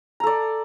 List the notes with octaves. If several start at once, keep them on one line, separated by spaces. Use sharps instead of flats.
A4 D5 A#5